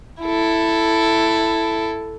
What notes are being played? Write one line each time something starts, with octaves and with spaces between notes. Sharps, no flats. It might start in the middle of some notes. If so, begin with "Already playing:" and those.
E4 A4